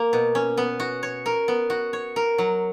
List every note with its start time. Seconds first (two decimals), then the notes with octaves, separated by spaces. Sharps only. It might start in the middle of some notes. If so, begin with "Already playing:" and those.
Already playing: A#3
0.13 B2
0.35 C#4
0.57 B3
0.80 F#4
1.03 C#5
1.26 A#4
1.48 B3
1.70 F#4
1.93 C#5
2.16 A#4
2.38 F#3